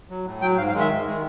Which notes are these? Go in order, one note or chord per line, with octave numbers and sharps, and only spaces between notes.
F#3
A2
F#3 G5
G#2 F5
F5
D#3 G#3
E5
G#2
D#3 G#3